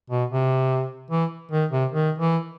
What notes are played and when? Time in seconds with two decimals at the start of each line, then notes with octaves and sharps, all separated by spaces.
0.10 B2
0.30 C3
1.11 E3
1.52 D#3
1.71 C3
1.92 D#3
2.19 E3